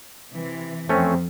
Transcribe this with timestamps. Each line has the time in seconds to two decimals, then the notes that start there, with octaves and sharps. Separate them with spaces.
0.33 C3 E3
0.89 F2 A3 C4 C#4